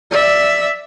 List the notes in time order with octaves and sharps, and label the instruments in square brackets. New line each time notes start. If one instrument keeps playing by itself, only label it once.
[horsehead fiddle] D5 E5